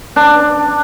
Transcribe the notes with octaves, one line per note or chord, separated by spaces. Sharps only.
D4